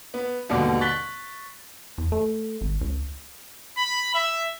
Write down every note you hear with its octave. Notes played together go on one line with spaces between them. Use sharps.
B3
D#2 G#2 B2 D3 G3 D6
C#6 F#6 A6 B6 G7
E2
A3
G#1
C#2
B5
E5